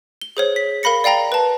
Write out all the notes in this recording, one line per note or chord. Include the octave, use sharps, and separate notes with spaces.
G7
G#4 C5 C#5
B6
A#4 F5 B5 A#6 C#7
D5 F5 G5 A#5 A#6
B4 A5